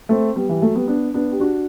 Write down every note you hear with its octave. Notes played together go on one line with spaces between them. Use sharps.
A3 C4
G3 B3
E3 G3
F#3 A3
G3 B3
B3 D4
B3 D4
G4
D4 F#4